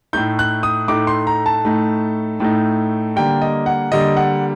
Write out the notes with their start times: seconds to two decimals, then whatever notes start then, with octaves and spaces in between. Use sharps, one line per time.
0.13 A2 A3 D#4 G6
0.39 F#6
0.63 D#6
0.88 A2 A3 D#4 D6
1.07 C6
1.27 A#5
1.46 A5
1.65 A2 A3 D#4
2.40 A2 A3 D#4
3.16 D3 G3 A#3 G5
3.42 D#5
3.66 F#5
3.91 D3 G3 A#3 D#5
4.17 F#5